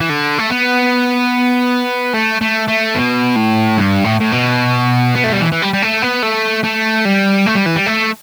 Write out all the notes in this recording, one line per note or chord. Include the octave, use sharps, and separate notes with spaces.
E3
D3
A3
B3
A3
A3
A3
B2
A2
G2
A2
A2
B2
B3
A3
G3
E3
E3
G3
G3
A3
B3
A3
A3
G3
A3
G3
E3
G3
A3